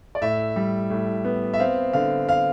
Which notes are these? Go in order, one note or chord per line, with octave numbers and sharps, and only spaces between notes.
D5
A2 E5
G3
A2
B3
E5
C4 F5
D3 F5
F5